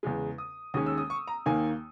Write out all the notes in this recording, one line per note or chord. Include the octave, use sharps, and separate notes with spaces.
E2 C#3 G#3
D#6
D#2 D#3 G#3 C#4 D#6
E6
D#6
C#6
A#5
D#2 D#3 A#3 G#5